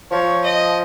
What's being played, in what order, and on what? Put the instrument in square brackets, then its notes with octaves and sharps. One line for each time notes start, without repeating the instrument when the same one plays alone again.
[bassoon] F3 [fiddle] C#5
[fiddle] D#5